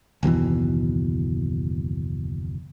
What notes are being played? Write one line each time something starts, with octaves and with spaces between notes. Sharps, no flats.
F#1 D#2 B2 E3